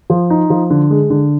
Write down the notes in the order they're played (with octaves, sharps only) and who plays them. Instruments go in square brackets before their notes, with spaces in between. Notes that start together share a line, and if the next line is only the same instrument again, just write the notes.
[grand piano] F3
D#4
F3
D3
G#3
D3